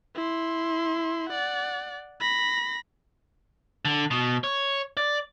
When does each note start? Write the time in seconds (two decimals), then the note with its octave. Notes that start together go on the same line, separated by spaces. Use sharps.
0.15 E4 C6
1.29 D5 F#5
2.20 B5 A#6
3.85 D3
4.11 B2
4.44 C#5
4.97 D5